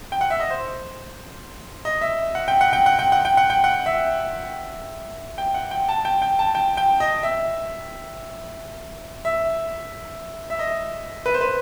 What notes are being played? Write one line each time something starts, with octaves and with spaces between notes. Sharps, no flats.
G5
F#5
E5
D#5
C5
D#5
E5
F#5
G5
F#5
G5
F#5
G5
F#5
G5
F#5
G5
F#5
E5
G5
F#5
G5
A5
G5
G5
A5
G5
G5
D#5
E5
E5
E5
D#5
B4
C5
B4